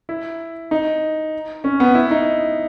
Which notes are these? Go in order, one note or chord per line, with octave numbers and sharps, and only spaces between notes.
E4
D#4
C#4
B3
E4
D#4